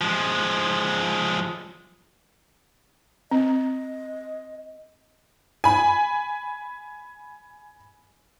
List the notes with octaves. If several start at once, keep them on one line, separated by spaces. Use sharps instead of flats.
F3 G#3
C4 D#5
G#5 B5